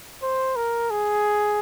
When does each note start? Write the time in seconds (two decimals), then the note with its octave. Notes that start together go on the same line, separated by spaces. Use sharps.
0.23 C5
0.56 A#4
0.90 G#4